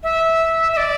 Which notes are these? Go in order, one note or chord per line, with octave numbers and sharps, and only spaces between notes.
E5
E5
D5